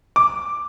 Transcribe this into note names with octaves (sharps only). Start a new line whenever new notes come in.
D6